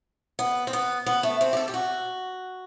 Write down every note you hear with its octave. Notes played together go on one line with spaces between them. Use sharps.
B3
C4
B3
B3
A3
C4
G4
A4
G4
F#4